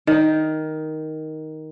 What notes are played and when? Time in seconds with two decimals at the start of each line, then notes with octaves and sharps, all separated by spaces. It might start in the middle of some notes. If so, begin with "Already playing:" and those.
0.07 D#3 D#4